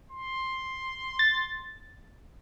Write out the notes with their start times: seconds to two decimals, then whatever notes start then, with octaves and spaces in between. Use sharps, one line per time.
0.11 C6
1.19 A6